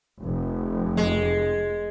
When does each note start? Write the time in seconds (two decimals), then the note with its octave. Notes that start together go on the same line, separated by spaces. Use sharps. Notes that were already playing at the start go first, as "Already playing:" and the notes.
0.21 F1
0.97 G#3